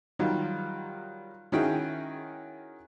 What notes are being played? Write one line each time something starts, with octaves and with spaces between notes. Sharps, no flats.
D#3 F#3 G3 F4
D#3 C#4 E4 F#4 G#4 G5